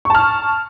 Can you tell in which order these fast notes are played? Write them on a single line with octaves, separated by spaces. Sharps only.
C#6 A5 F6